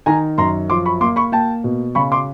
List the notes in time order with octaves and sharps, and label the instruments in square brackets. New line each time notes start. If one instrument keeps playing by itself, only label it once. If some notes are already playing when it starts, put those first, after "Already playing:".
[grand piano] D#3 G#5 A#5
F#2 A#5 C6
F3 C6 D6
B5 C#6
A#3 C6 D6
B5 C#6
A#3 G5 A5
B2
C#3 B5 C#6
C6 D6